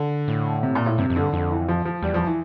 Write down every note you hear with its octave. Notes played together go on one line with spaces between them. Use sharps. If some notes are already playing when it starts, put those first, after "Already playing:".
Already playing: D3
A2
C3
A#2
A2
G2 C3
F2
D3
G2
F2 D3
E3
F3
F3
E2 G3
F3
E3